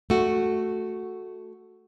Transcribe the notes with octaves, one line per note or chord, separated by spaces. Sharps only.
A3 F#4